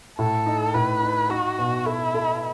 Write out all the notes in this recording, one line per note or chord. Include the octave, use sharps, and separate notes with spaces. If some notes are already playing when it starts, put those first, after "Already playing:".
A2 A4
D#4
A2 B4
D#4
D#4 F#4
B2
E4 A4
A4